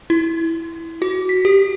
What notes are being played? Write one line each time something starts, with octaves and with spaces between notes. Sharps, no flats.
E4
F#4
B6
G4